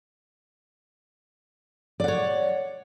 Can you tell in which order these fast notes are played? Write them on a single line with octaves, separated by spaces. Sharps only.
D5 F#5 C#5